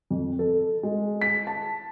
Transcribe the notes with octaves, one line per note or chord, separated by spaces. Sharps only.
F2
A4
G#3
B6
A5